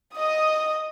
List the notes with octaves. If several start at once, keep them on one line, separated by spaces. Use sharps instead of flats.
D#5 D#6